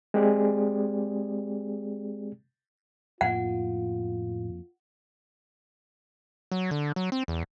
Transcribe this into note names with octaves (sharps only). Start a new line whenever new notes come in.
G#3 C4 G4 G#4 D5
F2 A2 A#3 F4 F#5
F#3
D3
F#3
C4
E2